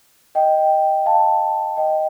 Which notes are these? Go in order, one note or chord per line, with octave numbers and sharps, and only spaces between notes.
D#5 G5
F5 A5
D#5 G5